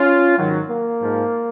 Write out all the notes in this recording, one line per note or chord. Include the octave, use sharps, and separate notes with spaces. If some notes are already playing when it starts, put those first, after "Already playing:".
Already playing: C#4 F4
G#2 D#3 F#3
A#3
G#2 F3